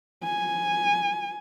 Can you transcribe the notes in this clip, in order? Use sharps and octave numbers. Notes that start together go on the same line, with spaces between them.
G#5